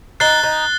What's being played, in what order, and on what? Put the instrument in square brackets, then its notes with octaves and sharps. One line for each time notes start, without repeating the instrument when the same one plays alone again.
[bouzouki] D#4 [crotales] F#6 A6 C7 G7
[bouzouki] D#4